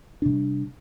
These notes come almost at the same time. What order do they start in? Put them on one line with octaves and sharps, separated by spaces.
D4 C3 G3